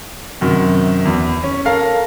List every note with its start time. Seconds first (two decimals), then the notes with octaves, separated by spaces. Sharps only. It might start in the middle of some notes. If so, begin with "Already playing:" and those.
0.41 F#2 C3 D#3
1.05 E2
1.44 C#4
1.65 A4 A#4 F5